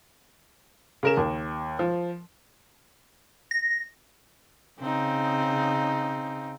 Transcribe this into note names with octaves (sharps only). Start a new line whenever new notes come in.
C#3 A#4 E7
D#2
F3
A#6
C#3 C4 D#4